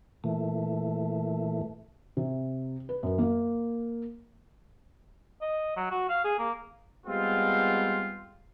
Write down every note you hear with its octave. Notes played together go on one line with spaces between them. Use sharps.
A#2 E3 A3
C3
B4
F#2
A#3
D#5
F#3
F#4
F5
G#4
A#3
G3 G#3 B3 C4 F4